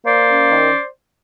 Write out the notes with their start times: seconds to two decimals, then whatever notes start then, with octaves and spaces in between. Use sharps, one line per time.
0.05 A#3 C5 D5
0.28 C#4
0.50 D#3